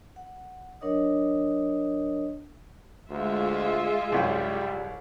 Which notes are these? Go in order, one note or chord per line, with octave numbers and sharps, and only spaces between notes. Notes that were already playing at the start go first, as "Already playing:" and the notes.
F#5
F#3 D4 A#4 C#5 D#5 D#6
D2 G#3 F4 E5
C2 F#2 G3 G5